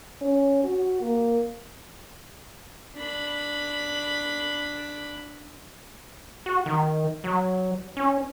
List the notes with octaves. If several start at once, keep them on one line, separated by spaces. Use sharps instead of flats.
C#4
F#4
A#3
D4 B5
F#4
D#3
F#3
C#4